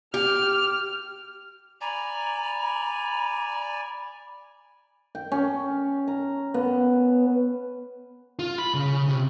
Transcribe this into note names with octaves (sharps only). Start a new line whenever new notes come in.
G4 F6
D5 G#5 A#5 B5
G5
C#4
A#5
B3
F4
B5
C#3
C3